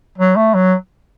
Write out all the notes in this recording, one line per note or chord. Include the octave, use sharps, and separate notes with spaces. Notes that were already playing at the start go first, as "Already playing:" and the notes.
F#3
A3
F#3